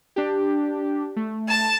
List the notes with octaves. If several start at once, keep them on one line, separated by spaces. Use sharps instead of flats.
D4 G4
A3
A5